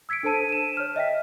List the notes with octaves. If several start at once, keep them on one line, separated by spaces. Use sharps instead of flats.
E6 G#6 B6 C#7 D7
D4 A4 C5 A5 D#7
D#7 E7
C#5 F6
D#5 E5 G5 B6